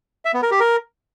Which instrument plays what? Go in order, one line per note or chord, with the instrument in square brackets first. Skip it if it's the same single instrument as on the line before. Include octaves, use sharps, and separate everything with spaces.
[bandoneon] E5
B3
A#4
G4
A#4